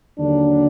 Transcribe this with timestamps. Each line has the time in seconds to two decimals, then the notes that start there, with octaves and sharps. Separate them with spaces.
0.18 D#2 D3 F#3 D4